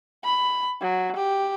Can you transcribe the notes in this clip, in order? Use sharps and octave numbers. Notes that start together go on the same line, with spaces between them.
B5
F#3
G4